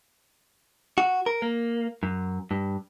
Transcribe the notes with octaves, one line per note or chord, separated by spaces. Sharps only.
F#4
A#4
A#3
F#2
G2